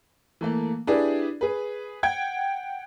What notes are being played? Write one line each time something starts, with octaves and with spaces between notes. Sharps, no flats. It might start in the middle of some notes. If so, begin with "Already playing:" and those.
E3 A3 A#3
D4 E4 G4 G#4 B4 D5
G#4 B4
F#5 G5 G#6